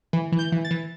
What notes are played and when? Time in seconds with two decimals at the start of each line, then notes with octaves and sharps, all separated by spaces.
0.13 E3
0.32 E3
0.39 G6
0.52 E3
0.65 A6
0.71 E3